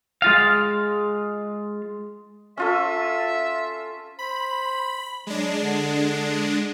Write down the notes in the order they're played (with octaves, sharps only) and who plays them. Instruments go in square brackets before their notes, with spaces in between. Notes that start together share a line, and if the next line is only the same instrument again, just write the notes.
[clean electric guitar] G#3 F4 F5
[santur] C#4 F4 A4 [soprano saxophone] E5
[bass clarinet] C5 [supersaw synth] B5
[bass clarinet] F#3 [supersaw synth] G#3 D4
[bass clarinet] D3